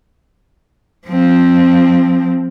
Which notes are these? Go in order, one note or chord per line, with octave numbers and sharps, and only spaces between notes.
F3 C4